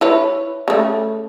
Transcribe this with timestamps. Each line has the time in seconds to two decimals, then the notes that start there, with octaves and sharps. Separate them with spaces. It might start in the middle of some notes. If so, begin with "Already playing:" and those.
0.01 E4 B4 C#5
0.68 C#3 A3